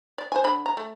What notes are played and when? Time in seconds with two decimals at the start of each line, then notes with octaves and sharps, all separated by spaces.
0.18 D5
0.32 C5 G#5
0.44 D3 B5
0.66 A#5
0.77 A3